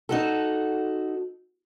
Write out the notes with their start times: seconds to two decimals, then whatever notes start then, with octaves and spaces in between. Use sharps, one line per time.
0.09 D#4 F#4 A4